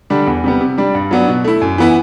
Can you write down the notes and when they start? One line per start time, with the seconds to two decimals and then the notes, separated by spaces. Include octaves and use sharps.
0.10 D3 G3 D4
0.27 E2
0.44 C3 G3 B3
0.61 C3
0.78 G3 D4
0.95 G2
1.11 F#3 B3 D4
1.28 B2
1.44 A3 E4
1.61 F#2
1.78 E3 B3 E4